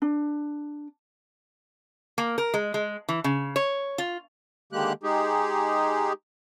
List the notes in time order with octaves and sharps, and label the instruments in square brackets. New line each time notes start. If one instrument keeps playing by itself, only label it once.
[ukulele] D4
[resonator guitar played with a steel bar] A#3
A#4
G#3
G#3
E3
C#3
C#5
F4
[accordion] D3 D#3 G#3 A#3 G4 F#6
G#3 D#4 G4 G#4